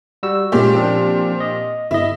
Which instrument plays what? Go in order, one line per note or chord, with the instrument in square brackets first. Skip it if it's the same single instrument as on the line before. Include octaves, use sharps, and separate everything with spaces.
[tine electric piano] G3 F#4 E6
[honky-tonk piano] A#2 G4 [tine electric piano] G#3 C#4
[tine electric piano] F3 C4 D4
D#5
[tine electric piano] G1 D#5 [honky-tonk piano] E4